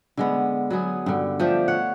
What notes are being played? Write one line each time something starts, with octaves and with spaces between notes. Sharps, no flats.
D3 G#3 B3
F#3 B3 G#4
G2 D3
F3 A3 D4 G4
C#5 F#5